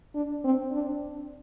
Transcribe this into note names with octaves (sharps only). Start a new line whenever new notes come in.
D4
C4
D4